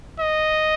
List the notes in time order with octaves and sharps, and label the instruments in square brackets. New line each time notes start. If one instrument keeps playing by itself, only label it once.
[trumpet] D#5